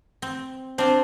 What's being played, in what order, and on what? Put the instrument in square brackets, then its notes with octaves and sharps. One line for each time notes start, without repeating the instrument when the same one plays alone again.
[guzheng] C4
[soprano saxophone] C4 [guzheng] D4 F4